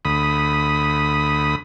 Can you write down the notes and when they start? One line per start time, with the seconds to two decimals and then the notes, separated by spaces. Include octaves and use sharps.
0.05 D2 B5 D#6